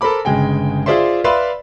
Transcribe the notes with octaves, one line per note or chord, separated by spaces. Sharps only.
A4 A#4 C5 B5 D6
G1 C#3 G#3 G5 G#5
F4 G#4 C5 D5 E5 C6
B4 D5 E5 F5 B5 C6